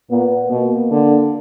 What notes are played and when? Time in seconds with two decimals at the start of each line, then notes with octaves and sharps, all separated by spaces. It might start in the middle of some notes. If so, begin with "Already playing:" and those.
0.11 A#2 B3
0.50 B2 A#3
0.91 D3